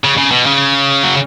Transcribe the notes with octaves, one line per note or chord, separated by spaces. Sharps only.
C#3
C#3
B2
C#3
F#3